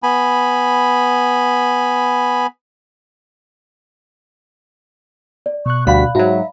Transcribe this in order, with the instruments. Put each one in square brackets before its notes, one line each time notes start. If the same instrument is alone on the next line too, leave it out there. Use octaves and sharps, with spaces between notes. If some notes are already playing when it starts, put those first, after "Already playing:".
[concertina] B3 G#5 B5
[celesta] D5
[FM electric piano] B2 F#6 [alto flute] C#6
[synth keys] D2 G3 B6 [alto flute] F#4 [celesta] D5 F5 B5
[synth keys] G#2 F#3 [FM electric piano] F#4 A#5 [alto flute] E5